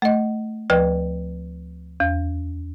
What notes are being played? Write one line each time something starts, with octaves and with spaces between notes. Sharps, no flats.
A3 D#5
D2 F3 B4 G5
E2